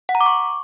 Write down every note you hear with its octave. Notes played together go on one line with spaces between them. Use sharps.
F#5
A#5
D6
C#6